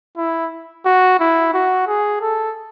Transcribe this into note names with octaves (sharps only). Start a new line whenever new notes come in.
E4
F#4
E4
F#4
G#4
A4